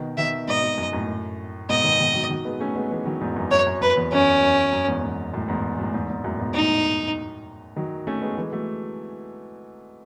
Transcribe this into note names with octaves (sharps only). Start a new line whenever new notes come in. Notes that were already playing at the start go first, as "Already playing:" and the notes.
Already playing: B2 D#3
B2 D#3 E5
G#2 B2 D#5
G#2 B2
F#2
F#2 A2
G#2 B2 D#5
B2 D#3
B2 D#3
D#3 F#3
D#3 F#3
G#3 B3
A3 C#4
G#3 B3
E3 G#3
D#3 F#3
E2 G#2
F#2
F#2 C#5
F#2
F#2 B4
E2
F#2 C#4
F#2
F#2
E2 G#2
E2 G#2
F#2 A2
E2 G#2
F#2 A2
E2 G#2
E2 G#2
F#2 A2
G#2 B2
F#2 A2 D#4
D#3 F#3
A3 C#4
G#3 B3
E3 G#3
F#3 A3